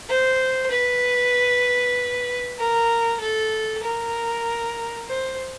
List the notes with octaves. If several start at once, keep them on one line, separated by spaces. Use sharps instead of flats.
C5
B4
A#4
A4
A#4
C5